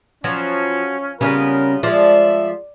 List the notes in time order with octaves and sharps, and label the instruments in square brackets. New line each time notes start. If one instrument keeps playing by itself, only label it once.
[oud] F3 [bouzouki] F#3 [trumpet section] C#4
[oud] C#3 G3 C#4 [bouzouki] B3 F4 [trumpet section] A#4
[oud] F3 G#3 [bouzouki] D5 [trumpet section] E5